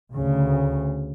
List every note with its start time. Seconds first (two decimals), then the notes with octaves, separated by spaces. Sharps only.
0.14 D2 C#3